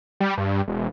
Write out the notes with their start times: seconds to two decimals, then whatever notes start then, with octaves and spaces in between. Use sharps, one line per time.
0.20 G3
0.38 G2
0.68 E1